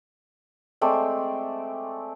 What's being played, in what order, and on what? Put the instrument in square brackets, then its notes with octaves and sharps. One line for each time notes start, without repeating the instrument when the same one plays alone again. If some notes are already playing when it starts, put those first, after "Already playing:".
[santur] G#3 A3 C4 D5